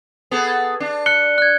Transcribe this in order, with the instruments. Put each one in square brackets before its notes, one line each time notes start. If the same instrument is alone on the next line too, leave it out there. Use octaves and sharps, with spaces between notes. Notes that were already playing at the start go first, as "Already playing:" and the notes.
[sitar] B3 G#4 A4
D4
[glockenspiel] F#6 C#7 G7
F#6 G#6